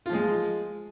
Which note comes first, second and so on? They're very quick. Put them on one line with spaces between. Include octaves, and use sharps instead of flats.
F4 F3 G#3